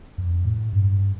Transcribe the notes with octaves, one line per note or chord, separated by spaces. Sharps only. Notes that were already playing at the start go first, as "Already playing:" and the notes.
F2
A2
G2